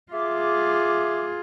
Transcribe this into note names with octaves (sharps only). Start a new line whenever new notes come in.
F4 G#4 E5 D6